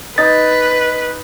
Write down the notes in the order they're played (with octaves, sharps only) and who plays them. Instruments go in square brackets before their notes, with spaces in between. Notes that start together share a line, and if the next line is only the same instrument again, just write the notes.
[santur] D#4 [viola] B4 [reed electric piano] A6